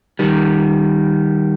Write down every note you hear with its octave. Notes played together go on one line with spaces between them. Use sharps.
D#3 G3